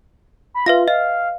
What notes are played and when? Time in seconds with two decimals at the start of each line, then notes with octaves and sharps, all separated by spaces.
0.54 B5
0.66 F4 B4 E5 A#6
0.88 D#5 F5